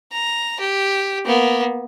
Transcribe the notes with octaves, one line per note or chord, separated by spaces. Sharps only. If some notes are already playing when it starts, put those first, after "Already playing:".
A#5
G4
A#3 B3